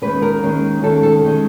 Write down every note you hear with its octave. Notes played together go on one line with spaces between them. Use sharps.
D#2 D#3 G#3 C#4 B4
A#4
D#2 D#3 G#3 C#4
D#2 D#3 G#3 C#4 A4
A4
D#3 G#3 C#4